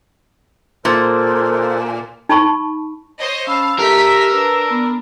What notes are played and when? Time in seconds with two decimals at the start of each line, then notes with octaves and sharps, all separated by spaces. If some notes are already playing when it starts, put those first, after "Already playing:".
0.85 A#2 A4 A#4 C5
2.29 D#4 A5 B5 C#6
3.19 C5 C#5 D#5
3.47 C#4 F5 A5 B5 E6
3.79 A3 D#4 G4 A#4 B6
4.32 D4 B4
4.70 B3